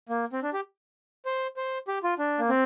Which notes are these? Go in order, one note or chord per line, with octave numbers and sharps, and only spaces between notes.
A#3
C4
D4
G4
C5
C5
G4
F4
D4
A#3
C4